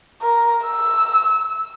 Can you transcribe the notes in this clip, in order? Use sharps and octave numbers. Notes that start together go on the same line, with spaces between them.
A#4
E6